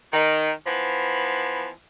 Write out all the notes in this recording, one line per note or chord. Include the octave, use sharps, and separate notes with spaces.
D#3
E3 F3 B3